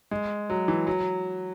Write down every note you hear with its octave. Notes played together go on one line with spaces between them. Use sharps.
G#3
F#3
E3
F#3